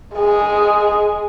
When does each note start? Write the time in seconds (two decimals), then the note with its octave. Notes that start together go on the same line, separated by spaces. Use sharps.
0.16 G#3 G#4